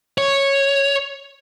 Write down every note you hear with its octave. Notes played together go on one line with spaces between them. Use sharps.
C#5